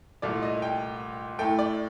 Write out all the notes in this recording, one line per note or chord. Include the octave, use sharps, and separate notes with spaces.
C2 A#2 A3 D5
D#5
G5
A2 A3 G5
D5